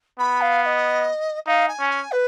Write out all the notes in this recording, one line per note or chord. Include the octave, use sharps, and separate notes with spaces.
B3 B5
F5
F5
D#5
D#4 F5
G#5
C#4
G#5
B4